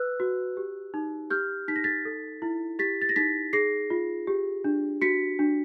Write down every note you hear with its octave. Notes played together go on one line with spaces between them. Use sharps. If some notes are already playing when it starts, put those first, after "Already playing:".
Already playing: B4 E6 F#6
F#4
G4
D#4
G4 F6 G6
D#4 B6
A#6
A6 B6
A4
E4
G4 A6 B6
A6
A#6
D#4 A6 B6
G#4 A#6 C7
F4
G4
D4
F#4 B6 C#7
D4